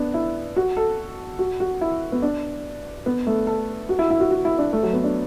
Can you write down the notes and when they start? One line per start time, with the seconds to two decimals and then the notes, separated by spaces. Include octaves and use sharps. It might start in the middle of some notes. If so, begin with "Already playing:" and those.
Already playing: B3 D4
0.14 E4
0.56 F#4
0.77 A4
1.39 F#4
1.60 F#4
1.81 E4
2.12 B3
2.22 D4
3.06 B3
3.27 A3
3.47 A4
3.89 F#4
3.99 E4
4.10 E4
4.20 F#4
4.31 F#4
4.45 E4
4.58 D4
4.73 A3
4.83 F#3
4.93 B3
5.04 D4